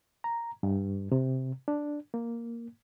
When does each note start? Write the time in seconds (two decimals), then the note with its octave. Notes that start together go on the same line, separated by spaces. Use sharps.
0.24 A#5
0.63 G2
1.12 C3
1.68 D4
2.14 A#3